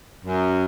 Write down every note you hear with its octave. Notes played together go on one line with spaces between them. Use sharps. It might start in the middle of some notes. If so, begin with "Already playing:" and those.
F#2